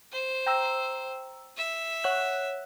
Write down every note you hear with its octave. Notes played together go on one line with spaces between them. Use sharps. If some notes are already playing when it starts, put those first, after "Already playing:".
C5
G5 A#5 E6
E5
C#5 F#5 F#6